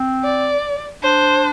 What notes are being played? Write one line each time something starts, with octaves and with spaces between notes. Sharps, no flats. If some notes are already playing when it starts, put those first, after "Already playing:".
Already playing: C4
D5
D4 C5